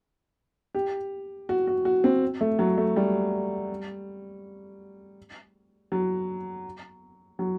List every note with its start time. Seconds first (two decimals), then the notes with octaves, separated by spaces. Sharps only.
0.75 G4
1.49 F#4
1.67 F#4
1.85 F#4
2.04 C4
2.41 A3
2.59 F#3
2.78 A3
2.96 G3
5.92 F#3
7.39 F#3